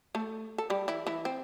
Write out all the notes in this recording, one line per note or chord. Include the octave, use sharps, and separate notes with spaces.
A3 A4
A4
G3 G4
E3 E4
E3 E4
C4